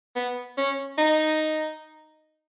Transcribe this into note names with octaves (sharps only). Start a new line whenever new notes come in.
B3
C#4
D#4